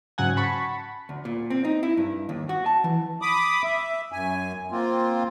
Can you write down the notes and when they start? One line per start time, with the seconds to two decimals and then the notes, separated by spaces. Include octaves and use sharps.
0.18 G#2 C#3 F#3 F#5 G#5
0.36 F#5 A5 B5 C#6
1.09 D2
1.25 A#2
1.50 C4
1.65 D#4
1.83 E4
1.97 G2
2.29 D#2
2.49 F#4
2.66 A5
2.84 E3
3.22 B5 D6 D#6
3.63 E5
4.12 F#2 G#5
4.71 A#3 C4 F4